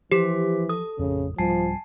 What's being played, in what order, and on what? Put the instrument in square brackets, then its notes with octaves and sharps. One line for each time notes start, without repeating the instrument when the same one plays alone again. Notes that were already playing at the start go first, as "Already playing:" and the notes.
[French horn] E3 [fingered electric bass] F3 [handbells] G4 [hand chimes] C5 D6 B6
[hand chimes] A4 [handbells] D#6
[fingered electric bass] A1 F2 [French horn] C#3
[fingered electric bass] C2 G#2 G3 [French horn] F3 [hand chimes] G#5 A5 C7